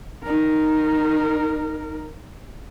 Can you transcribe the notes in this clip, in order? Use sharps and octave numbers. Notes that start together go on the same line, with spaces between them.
D#4 A#4